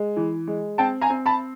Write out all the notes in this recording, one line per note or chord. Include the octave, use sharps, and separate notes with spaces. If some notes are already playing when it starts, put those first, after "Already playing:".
Already playing: G#3
E3
G#3
C4 G5 A5
G#5 A#5
C4
A5 B5